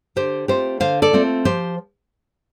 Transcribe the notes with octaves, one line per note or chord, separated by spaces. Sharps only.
D3 G4 C5
A3 C4 F4 G4 C5
D3 C5 F5
A4 D5
A3 C4 F4
F3 G4 C5